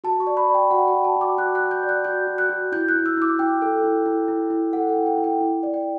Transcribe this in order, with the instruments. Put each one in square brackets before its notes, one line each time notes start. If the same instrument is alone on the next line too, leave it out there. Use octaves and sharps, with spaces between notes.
[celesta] F#4 A5
C#6
D5
B5
D5
G5
F#4 F#5
G5
F#4
A5
F#4 D6
F#4 F#6
F#6
F#4
G6
D5
F#6
F#4 G6
F#4
F#6
F#4
E4 G6
F#6
E4
E6
E4 D6
E4 G5
A4
E4
E4
E4
E4
A4 F#5
G5
E4
G5
E4
G5
E4
D5
G5